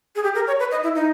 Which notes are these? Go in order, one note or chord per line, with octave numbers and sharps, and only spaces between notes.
G#4
G4
A#4
C#5
B4
D#5
E4
D#4